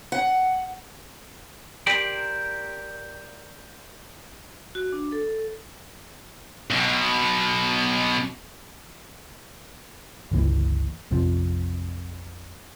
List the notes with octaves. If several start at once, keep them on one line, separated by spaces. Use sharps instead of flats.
F#5
G4 A#4 C5 D5
F#4
D4
A4
B1 B2
G1 C#2 E3 A#3
A#1 F2 C3 F3